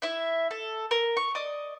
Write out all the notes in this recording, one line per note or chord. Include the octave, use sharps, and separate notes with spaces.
E4 E5
A4
A#4
C#6
D5 D#5 D#6